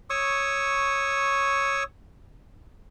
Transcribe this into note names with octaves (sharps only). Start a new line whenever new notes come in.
C#5 C#6 D#6 E6